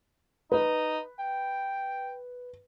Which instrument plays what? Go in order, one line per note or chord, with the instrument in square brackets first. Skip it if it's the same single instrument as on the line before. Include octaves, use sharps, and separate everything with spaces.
[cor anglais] D#4 [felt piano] B4
[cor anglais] G5